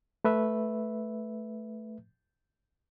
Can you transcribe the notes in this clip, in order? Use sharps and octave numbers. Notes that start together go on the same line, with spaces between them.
A3 B4 E5